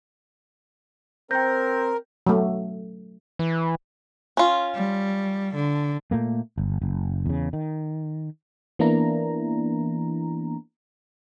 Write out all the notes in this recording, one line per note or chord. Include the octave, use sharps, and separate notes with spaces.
C4 A#4 C5 G5 G6 A#6
F#3 A3
E3
C#4 F4
G3
D3
A#2 A3 A#3
G1
F#1
E2 C#3
D#3
E3 A#3 B3 D4 E4 A#5